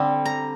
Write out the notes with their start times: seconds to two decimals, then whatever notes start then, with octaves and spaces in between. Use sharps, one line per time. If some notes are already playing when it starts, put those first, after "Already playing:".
Already playing: D3 G3 C4
0.25 A#5